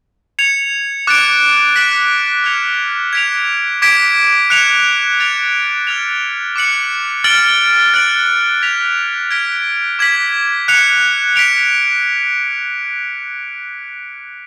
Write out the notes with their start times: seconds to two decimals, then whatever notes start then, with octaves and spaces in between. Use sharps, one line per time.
0.39 G#6 C#7 F7
1.07 D6 F#6 A6 D7
1.76 F#6 B6 D7 F#7
2.44 F6 G#6 C#7 F7
3.13 G#6 B6 D7 F7
3.82 D6 G#6 B6 D7
4.50 F#6 C#7 F7
5.20 F#6 A6 D7 F7
5.87 F6 A6 F7
6.56 D6 F#6 C#7 F#7
7.24 F6 A6 D7 F#7
7.94 F#6 A6 D7 F#7
8.61 G#6 B6 F7
9.30 F6 G#6 B6 D7
9.99 D6 G#6 B6 F#7
10.68 F#6 C#7 F7
11.36 F#6 B6 D7 F7